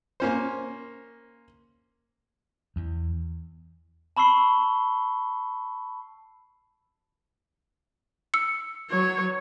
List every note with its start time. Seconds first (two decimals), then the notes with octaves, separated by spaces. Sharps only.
0.20 A#3 C#4 C5
2.76 E2
4.17 A5 B5 C#6 E6 C7 G7
8.34 E6 C#7
8.90 F#3 C#5